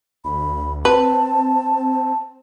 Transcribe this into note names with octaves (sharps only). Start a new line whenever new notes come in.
D2 B5
C4 B4 A5